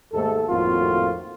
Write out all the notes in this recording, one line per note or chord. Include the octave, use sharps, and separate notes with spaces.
D#2 G#2 A3 A4
G#1 F2 A2 A#3 F4 F#4